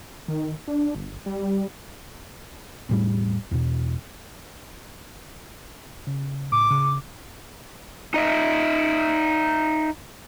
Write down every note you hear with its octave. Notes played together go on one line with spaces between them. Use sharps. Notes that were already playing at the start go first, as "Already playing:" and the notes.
D#3
D4
G1
G3
E1 A2 G3
E2 B2
C#3
A2 D6
C#3
D#4 D#5 E5